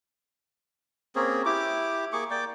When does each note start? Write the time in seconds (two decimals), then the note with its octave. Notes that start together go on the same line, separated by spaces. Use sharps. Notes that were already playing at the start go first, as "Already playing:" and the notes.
1.15 A#3 C4 C#4 G#4
1.46 E4 G4 D6
2.13 A#3 G#4 C#6 D6
2.31 A#3 D5 G5 D6